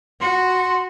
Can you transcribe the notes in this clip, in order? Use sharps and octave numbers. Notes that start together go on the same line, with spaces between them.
F#4 C6